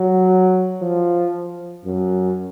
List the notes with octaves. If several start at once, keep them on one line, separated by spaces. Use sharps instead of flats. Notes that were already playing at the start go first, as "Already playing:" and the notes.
Already playing: F#3
F3
F#2